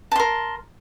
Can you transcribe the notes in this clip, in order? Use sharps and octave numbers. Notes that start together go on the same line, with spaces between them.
A#4 A5 C6